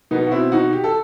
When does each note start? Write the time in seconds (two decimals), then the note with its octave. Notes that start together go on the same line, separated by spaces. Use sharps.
0.11 B2 B3 D#4
0.27 F#4
0.31 C4 E4
0.52 D#4 F#4
0.73 G4
0.84 A4